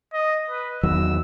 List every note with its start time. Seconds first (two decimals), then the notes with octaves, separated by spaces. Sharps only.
0.13 D#5
0.50 B4
0.83 E2 D#3 F#3 E6